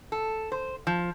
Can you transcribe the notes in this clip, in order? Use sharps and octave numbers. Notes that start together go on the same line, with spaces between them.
A4
C5
F3